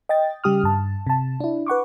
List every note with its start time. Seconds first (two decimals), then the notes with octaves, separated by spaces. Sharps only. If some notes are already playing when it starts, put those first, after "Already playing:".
0.09 D#5 G5 A6
0.44 C#3 G3 G4 D#6 F6
0.64 G2 A5
1.07 C3 A5
1.40 D4 E4
1.66 B4 F#5 C#6 D6